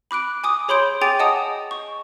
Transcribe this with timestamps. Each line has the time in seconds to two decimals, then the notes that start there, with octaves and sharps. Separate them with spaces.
0.11 B5 D6 F#6 D7
0.44 G#5 D6 D#6
0.68 G#4 C#5 B5 C6 G6 D7
1.01 G#4 G5 G#5 D6 A6 F7
1.19 D#5 F#5 G#5 A5 D#6
1.71 C#6